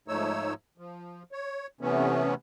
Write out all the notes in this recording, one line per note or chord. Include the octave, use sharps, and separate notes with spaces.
G#2 F3 A3 D#4 C#5 E6
F3
C#5
C3 E3 A3 B3 C#4